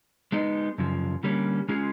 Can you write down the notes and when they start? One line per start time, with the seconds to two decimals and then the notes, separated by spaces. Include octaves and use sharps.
0.32 G#3 B3 D#4
0.78 F#2 C#3 F3
1.23 D3 G3 A#3 C#4
1.69 G#3 C#4 F4 G#4